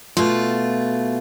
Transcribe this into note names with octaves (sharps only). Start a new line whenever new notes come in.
B2 A3 F4